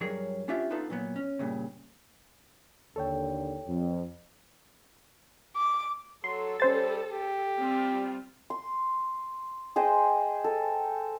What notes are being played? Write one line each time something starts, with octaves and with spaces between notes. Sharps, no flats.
G2 F#3 G#4 A#4 C#5
C#4 D4 F4 G4 E5 F#5
B3 D4 D#4 F4 A4 B4
A#2 F#3 B3
C#4
G2 A#2 C#3
D#2 D3 A4 C#5 G5
F2
D6
F#3 A4 C6
G3 C#4 C5 A6
G4
G3 C4 F4
C6
G#4 C5 D#5 G5
A4